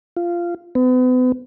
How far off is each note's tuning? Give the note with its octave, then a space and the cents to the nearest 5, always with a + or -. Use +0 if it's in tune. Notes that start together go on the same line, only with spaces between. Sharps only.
F4 -15
B3 +40